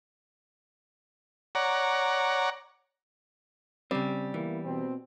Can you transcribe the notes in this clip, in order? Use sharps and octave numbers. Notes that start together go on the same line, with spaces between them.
C#5 D5 F#5 A#5
C#3 G3 C4
E3 A#3 B3 E4
B2 C4